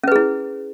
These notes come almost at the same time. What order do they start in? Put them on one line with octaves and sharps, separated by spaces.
C#4 B4 G#4 E4